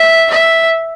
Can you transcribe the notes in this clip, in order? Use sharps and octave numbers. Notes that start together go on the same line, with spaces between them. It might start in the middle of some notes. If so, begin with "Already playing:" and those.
Already playing: E5
E5